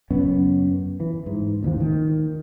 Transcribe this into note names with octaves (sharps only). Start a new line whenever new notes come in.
F#2 C#3 B3 C#4
E3
G#2
A1 D#2 D#3 F3
D#3